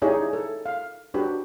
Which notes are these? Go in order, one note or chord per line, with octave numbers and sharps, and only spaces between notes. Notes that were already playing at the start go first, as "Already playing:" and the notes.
D#4 E4 G4 G#4 C#5 D5
A4
F5
D4 F#4 G4 B4